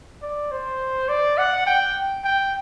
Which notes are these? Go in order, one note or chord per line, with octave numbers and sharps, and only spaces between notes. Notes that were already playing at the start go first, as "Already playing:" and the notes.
D5
C5
D5
F#5
G5
G5